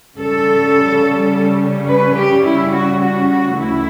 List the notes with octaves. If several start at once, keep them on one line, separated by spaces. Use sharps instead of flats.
C#3 G3 C#4 A4
B4
G4
E4
F#4
F#4
F#4
D2 C#3 E3 A3 E4